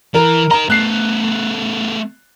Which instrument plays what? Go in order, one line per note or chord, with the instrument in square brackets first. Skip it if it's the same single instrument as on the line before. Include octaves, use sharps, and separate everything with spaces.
[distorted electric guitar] E3 [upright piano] A#4
[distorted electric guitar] A#4 D#5 [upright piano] A#5
[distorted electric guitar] A3 B3 [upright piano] F#6 C7